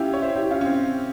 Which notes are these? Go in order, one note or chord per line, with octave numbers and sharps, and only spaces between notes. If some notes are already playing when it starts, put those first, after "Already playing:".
Already playing: C#4 E4 F4 G4
C#5
C5 E5
E4 G4
C#4 F4
C#4
C4